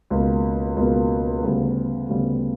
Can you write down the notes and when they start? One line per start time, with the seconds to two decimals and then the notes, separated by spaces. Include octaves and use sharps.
0.10 C#2 B2 A#3
0.76 C#2 B2 A#3
1.43 D2 C#3 G3 B3
2.08 D2 C#3 G3 B3